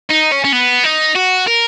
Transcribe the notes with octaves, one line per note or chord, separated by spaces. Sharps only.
D#4
C#4
C#4
B3
D#4
F#4
A#4